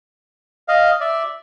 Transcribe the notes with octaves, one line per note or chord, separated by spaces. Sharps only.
D#5 F5
D5 E5